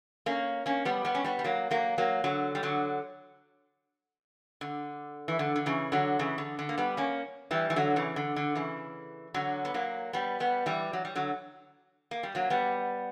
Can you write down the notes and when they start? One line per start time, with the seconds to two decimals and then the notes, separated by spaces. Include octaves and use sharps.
0.26 A#3 C#4
0.66 A#3 C#4
0.85 G3 B3
1.05 G3 B3
1.15 C#4
1.24 G3 B3
1.39 G3
1.44 F#3 A#3
1.71 F#3 A#3
1.98 F#3 A#3
2.24 D3 F#3
2.55 G3
2.63 D3 F#3
4.61 D3
5.28 E3
5.39 D3
5.56 D3
5.66 C#3 E3
5.92 D3 F#3
6.19 C#3 E3
6.38 D3
6.59 D3
6.69 A#3
6.78 G3 B3
6.97 A#3 C#4
7.51 E3 G3
7.70 E3
7.76 D3 F#3
7.96 C#3 E3
8.16 D3
8.36 D3
8.55 C#3 E3
9.34 D3 F#3
9.65 B3
9.74 F#3 A#3
10.13 G3 B3
10.40 G3 B3
10.66 E3 G3
10.93 F#3
11.05 G3
11.15 D3 F#3
12.11 A#3
12.23 G3
12.35 F#3 A#3
12.50 G3 B3